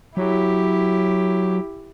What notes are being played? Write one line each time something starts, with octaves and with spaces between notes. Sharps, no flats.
F#3 E4 G4